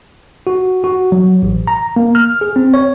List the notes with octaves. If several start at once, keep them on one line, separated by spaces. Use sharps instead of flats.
F#4
F#4
F#3
A1
A#5
A#3
F6
G#4
C4
C#5